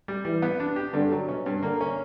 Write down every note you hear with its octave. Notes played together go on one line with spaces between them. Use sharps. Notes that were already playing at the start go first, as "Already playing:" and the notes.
G3
E3 G3
B3
D4
G4
G2 D3
F#3
B2 C#4
G2
D3 A#3
C#4